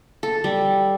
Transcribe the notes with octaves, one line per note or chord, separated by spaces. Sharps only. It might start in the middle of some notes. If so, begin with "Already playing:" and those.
A4
G3